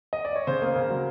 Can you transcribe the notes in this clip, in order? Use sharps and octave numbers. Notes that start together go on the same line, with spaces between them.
D#5
D5
C#5
C#3 C5
A#3
C#3
F#3